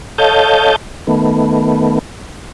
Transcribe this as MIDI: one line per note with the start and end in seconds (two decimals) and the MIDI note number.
0.18 0.76 69
0.18 0.76 73
0.18 0.76 75
0.18 0.76 77
0.18 0.76 81
0.18 0.76 91
1.07 1.99 51
1.07 1.99 57
1.07 1.99 59